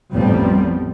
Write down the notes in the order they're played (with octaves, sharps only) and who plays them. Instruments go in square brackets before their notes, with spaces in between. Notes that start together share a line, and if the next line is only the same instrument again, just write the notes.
[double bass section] A1 F2 F3 G3 B3 C4